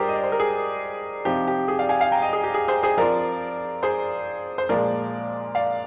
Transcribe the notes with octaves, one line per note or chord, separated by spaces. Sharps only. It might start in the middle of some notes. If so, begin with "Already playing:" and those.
Already playing: G3 D4 F4 G4 G#4 A#4 C5 D5
D#5
D5
C5
A#4
G#4
C3 F3 C4 D#4 G4
G4
G#4
D5 F5
F5 G#5
F5 G#5
G5 A#5
D#5 G5
G#4
G4
G#4
G#4 C5
G#4 C5
F3 C4 F4 A#4 D5
G#4 C5
C5
A#2 F3 G#3 A#4 D5
D5 F5